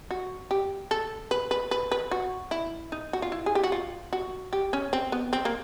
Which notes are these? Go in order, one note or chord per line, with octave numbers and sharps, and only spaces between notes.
F#4
G4
A4
B4
B4
B4
B4
F#4
E4
D#4
F#4
F4
E4
G#4
G4
F#4
F4
F#4
G4
C#4
C4
B3
C4
A#3